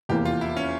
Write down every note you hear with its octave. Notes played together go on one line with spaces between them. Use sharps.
F1 E2 E3 A#3 G4
F4
E4
C#4